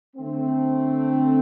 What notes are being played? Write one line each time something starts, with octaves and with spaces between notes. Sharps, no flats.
D3 A3 C4